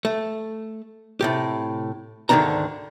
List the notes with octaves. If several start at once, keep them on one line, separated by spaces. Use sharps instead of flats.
A3
A2 C3 G4
D2 G#2 D3 D#3 D4 A#5